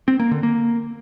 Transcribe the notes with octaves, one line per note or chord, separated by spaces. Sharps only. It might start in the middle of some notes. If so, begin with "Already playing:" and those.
C4
A#3
D3
A#3